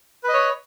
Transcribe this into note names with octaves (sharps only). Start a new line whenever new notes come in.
B4 C#5 D#5